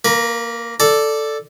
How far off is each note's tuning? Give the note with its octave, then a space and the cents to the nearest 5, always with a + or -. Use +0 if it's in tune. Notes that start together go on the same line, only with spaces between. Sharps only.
A#3 +0 B4 -40
A4 +0 D5 +0